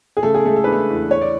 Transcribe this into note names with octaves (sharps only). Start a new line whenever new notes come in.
G#4
C#3 A3 A4
G#4
G#3 A3 A4
A4
D4 B4
A3 A4
E2
E3 C#5
D5